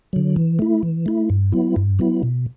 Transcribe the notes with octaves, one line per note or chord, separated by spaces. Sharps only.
D3 F#3
E3
A3 E4
E3
A3 E4
G2
F#3 B3 E4
G2
F#3 B3 E4
B2